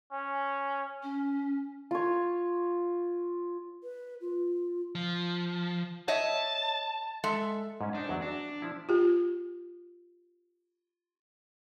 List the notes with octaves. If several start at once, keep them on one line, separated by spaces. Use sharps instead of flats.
C#4
C#4
F4 C#5
B4
F4
F3
C#5 D#5 E5 A5
G#3 A4 E5
G#2 C#4
D4 D#4 C5 G#5
E2 F#3
D4 F#4
F3 E4 A5
F4 G4